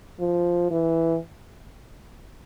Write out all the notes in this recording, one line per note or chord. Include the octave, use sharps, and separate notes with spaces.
F3
E3